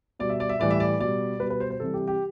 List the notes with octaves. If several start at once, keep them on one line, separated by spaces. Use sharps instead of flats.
B2 G3 D5
E5
D5
E5
A2 E3 G3 D5
E5
D5
B2 G3 D5
B2 G3 B4
B4
C5
C5
C3 E3 G3 A4
G4
G4